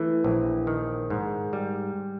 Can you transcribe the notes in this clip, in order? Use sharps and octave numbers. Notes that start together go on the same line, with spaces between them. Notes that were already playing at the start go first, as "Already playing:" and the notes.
Already playing: E3 A3
A#1
D#3
G#2
G3